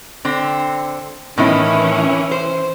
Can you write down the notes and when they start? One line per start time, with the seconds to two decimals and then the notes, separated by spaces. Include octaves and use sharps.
0.25 D3 C4
1.38 A2 D#3 E3 C#4 E4
2.31 C5